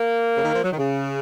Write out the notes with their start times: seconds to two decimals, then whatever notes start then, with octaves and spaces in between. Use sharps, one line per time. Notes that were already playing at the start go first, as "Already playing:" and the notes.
Already playing: A#3
0.35 C#3
0.44 D#3
0.53 F3
0.63 F#3
0.72 D#3
0.77 C#3